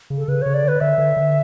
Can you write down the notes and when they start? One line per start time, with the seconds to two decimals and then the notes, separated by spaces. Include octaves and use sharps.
0.10 C#3
0.17 A4
0.28 C#3 B4
0.42 C#3 C#5
0.54 D5
0.64 D3 B4
0.80 D3 E5
0.98 D3
1.17 D3